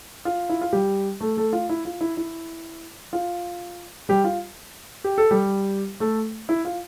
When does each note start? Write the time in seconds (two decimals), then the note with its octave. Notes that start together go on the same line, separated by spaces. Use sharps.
0.25 F4
0.49 E4
0.61 F4
0.73 G3 G4
1.20 A3 A4
1.37 A3 A4
1.53 F4
1.69 E4
1.85 F4
2.01 E4
2.17 E4
3.13 F4
4.09 G3 G4
4.24 F4
5.04 G4
5.18 A4
5.31 G3 G4
6.00 A3 A4
6.49 E4
6.65 F4